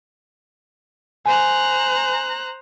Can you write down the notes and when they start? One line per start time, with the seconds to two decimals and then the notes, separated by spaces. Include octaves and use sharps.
1.26 C5 G#5 A#5 F#6